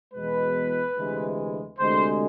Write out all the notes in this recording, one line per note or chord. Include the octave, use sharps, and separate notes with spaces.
E2 B2 G#3 B4
D2 C3 E3 G#3
D2 C3 G#3 C5